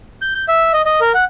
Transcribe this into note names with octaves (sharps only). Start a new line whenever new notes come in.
G6
G6
E5
D#5
D#5
A#4
F#5